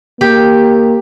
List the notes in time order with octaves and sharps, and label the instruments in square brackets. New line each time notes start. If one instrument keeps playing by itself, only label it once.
[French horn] A#3 [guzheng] G4